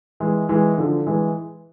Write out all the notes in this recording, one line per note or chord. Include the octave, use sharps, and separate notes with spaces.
E3 G#3
E3 G#3
D3 F3
E3 G#3